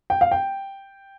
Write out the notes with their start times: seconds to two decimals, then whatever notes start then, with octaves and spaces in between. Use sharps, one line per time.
0.10 G5
0.21 F5
0.31 G5